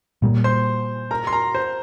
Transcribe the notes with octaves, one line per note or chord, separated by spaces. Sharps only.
A#2 G3 A#3
C5 C6
A#4 A#5
C6
A#4 A#5
C5